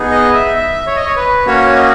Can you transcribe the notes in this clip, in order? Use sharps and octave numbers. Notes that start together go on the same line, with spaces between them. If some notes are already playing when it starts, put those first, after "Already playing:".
Already playing: B3 D#4 G#4
D#5
E5
E5
C#5
D#5
C#5
B4
A#3 C#4 F#4 C#5
D#5